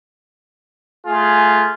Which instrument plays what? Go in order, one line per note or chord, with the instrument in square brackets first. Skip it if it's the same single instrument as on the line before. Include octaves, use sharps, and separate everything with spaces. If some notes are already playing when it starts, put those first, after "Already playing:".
[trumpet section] A3 F4 G#4